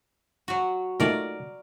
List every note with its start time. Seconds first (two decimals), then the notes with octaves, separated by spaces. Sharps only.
0.48 F#3 F#4
1.00 A#2 D#3 A3 A#4 D5